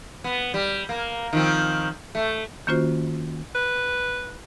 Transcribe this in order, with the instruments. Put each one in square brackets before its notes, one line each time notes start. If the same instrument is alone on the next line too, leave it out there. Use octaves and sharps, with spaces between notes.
[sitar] B3
G3
A#3
D#3 F3 C4
A3
[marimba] D#3 A#3 C#4 F4 F#4 C5
[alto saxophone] B4